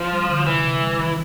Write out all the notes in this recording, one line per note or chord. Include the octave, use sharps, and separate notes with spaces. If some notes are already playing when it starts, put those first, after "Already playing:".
Already playing: F3
G3
D3
C3 E3
C3
G3
D#3